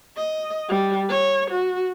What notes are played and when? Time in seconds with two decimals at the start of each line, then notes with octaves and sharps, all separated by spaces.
0.16 D#5
0.69 G3
1.09 C#5
1.51 F#4